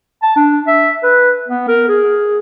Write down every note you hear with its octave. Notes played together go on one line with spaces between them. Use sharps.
A5
D4
E5
B4
B3
A#4
G#4